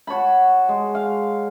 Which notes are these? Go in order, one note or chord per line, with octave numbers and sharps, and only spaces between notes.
F#4 C#5 A5 B5
G#3
F5